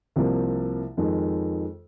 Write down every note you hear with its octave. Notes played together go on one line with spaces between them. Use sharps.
C2 C3 F3 A#3
F2 D#3 G#3